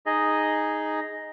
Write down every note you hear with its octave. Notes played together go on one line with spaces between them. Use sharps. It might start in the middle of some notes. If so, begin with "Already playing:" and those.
D#4 G#4 D#5